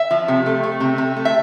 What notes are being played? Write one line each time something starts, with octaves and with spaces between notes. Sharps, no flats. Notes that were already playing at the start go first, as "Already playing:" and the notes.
Already playing: E5
F3
C3
A3
A3
C3
C3
A3
E5